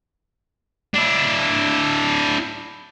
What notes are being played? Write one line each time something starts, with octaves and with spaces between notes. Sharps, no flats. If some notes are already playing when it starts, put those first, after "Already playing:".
D4 E4